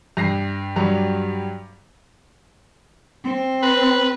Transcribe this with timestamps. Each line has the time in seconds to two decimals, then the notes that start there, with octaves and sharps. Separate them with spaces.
0.17 G2 A#6 C7
0.76 G2 F#3 G3
3.24 C4
3.62 B4